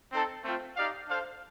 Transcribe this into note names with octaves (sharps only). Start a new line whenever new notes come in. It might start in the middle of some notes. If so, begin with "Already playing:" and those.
C4 D#4 A4
A3 C4 F4 C5 G5
D#4 G4 D5 F5
D4 A4 C5 F5